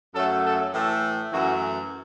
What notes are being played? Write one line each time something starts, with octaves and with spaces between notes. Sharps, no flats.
F#2 F#3 A3 A4
A4
A2 E3 A3 A4
F#2 E3 A3 F#4